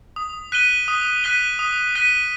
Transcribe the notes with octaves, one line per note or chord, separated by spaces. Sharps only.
D#6
F#6 B6 D#7 G7
D#6
F#6 B6 D#7 G7
D#6
F#6 B6 D#7 G7